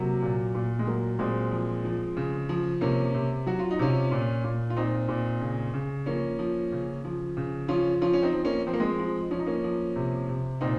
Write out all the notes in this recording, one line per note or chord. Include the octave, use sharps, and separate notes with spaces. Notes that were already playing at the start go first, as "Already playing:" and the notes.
Already playing: C3 F#3 A#3
A#2
A#2
G#3
F#3 A#3
A#2 G#3 C4
F3
F3
C#3
F3
C3 A#3 C#4
C3
F#3 F#4
F4
D#4
C3 C#4 F4
A#2
A#2
F4
A#2 C4 D#4
A#2
C#3
C#3
F3 A#3 C#4
F3
C#3
F3
C#3
F3 C#4 F4
F3 C#4 F4
C#4
C4 D#4
F3
A#3 C#4
F3 C4
A#3
G#3 C4
F3
F3 C#4
D#4
A#3 C#4
F3
C3
C3
A#2 C4 D#4